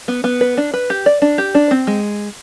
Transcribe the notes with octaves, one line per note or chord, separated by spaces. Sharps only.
B3
B3
B4
D4
B4
G4
D5
D4
G4
D4
C4
G#3